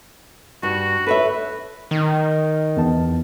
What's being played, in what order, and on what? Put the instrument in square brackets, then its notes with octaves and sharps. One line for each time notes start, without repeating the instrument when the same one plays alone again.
[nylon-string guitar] G2 [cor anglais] F#4
[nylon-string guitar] A4 C#5 E5 [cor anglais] B4
[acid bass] D#3
[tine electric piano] E2 A5